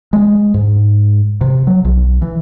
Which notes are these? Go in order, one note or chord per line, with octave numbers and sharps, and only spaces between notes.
G#3
G#2
C3
F#3
B1
E3